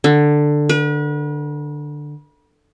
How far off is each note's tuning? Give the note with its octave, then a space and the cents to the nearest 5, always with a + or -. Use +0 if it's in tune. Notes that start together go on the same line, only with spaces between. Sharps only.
D3 +10
B4 -40